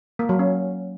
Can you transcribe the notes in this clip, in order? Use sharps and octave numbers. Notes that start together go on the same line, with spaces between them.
A#3
F#3
C#4